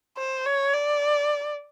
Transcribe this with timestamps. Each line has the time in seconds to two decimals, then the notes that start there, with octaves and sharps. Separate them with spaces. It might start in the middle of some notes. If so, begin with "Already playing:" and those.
0.17 C5
0.45 C#5
0.74 D5